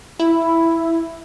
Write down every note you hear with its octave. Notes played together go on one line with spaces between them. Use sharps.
E4